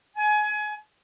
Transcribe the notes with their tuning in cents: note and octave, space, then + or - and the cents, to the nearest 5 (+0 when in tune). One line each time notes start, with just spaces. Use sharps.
G#5 +25